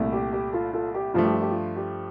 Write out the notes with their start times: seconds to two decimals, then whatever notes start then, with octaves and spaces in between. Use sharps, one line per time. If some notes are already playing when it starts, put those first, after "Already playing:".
Already playing: C2 A#2 A3 E4
0.12 G4
0.32 G4
0.52 F4 A4
0.73 F4 A4
0.94 G4
1.14 G2 F3 A3 F4
1.24 G4
1.32 F4
1.41 G4
1.51 F4
1.76 G4